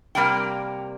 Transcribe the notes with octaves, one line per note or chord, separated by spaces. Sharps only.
C3 G3 A#3 G5